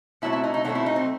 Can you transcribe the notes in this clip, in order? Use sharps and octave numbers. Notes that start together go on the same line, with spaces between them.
B2 F#3 A3 C4 E4
E4
D#4
D#4
B2 F#3 A3 C4 D#4
E4
D#4
C4